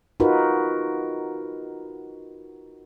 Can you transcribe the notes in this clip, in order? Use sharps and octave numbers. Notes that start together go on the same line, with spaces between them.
D#4 F4 F#4 A#4 B4